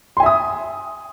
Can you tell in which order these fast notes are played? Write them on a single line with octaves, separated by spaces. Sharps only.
C6 G#5 E5 D#6